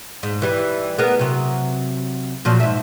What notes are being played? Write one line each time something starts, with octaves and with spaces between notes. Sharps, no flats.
G#2
E3 G3
B3 G#4 A#4
C3 F#3
A#2 F3 F#3
G#2 E5